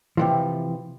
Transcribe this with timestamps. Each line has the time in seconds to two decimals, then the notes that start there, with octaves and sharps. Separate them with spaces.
0.17 C3 E3 F3